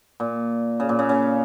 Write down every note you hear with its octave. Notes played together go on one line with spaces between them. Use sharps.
A#2
C#3
A#2
C#3
C#3